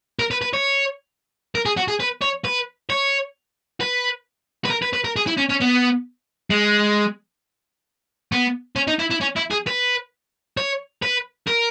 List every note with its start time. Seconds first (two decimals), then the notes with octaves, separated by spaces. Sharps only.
0.19 A#4
0.31 B4
0.42 B4
0.54 C#5
1.55 A#4
1.66 G#4
1.77 F#4
1.88 G#4
2.00 B4
2.22 C#5
2.45 B4
2.90 C#5
3.81 B4
4.65 B4
4.70 A#4
4.82 B4
4.93 B4
5.04 A#4
5.16 G#4
5.27 E4
5.38 C#4
5.50 C#4
5.61 B3
6.50 G#3
8.32 B3
8.76 C#4
8.88 D#4
8.99 E4
9.11 E4
9.21 C#4
9.36 E4
9.51 G#4
9.67 B4
10.57 C#5
11.02 B4
11.48 A#4